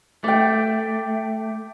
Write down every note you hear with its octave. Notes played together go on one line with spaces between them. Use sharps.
A3 G5 D6